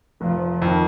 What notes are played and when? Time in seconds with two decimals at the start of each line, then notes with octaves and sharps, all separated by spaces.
0.21 F1 F3
0.62 F2 D#3